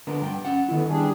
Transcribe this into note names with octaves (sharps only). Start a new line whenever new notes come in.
D3 B3 A#4
G2 G5
C#4 F#5
D3 D#3 B3 E4
G3 D4 G#4